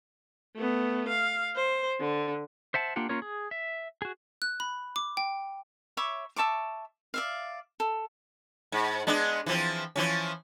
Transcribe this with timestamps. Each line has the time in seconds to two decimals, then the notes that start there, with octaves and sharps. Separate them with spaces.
0.55 A3 B3
1.08 F5
1.55 C5
1.99 D3
2.74 C5 E5 F#5 A5
2.96 A#3 D4 F4 G4 F#5
3.09 A#3 C#4 F4 A#4 C#5
3.22 G#4
3.51 E5
4.02 F#4 G#4
4.42 F#6
4.60 B5
4.96 D6
5.17 G5
5.97 C#5 E5 B5 D6
6.36 E5 A5 C#6 D6
7.14 D5 E5 F5
7.80 A4
8.72 G#2
9.07 G#3 B3 D4
9.46 E3 F3 C4
9.96 E3 F3 C#4